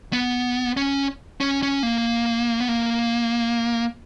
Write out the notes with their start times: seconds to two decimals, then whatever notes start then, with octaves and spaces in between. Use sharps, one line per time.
0.13 B3
0.77 C#4
1.40 C#4
1.63 C#4
1.83 A#3
2.60 B3
2.68 A#3